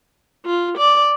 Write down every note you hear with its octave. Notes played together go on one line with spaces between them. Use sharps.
F4
D5